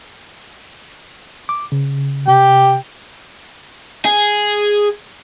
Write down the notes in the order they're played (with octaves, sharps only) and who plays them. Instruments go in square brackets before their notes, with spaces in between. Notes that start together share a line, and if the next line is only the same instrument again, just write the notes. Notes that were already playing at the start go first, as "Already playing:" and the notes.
[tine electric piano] D6
C#3
[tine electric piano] C3 [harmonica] G4 G5
[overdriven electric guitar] G#4